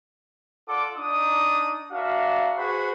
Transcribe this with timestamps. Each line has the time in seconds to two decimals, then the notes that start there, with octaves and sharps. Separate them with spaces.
0.68 F4 A4 D5 F#5 D6
0.97 D4 D#4 D#6
1.92 D4 F#4 A#4 E5 F5
2.57 F#4 G#4 B4 C5 F#5 B5